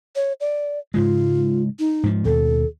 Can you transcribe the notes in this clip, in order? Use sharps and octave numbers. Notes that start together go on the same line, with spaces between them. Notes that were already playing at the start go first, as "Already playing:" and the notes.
C#5
D5
G#2 C#3 G#3 F4
D#4
G#2 F3
D#2 B2 A4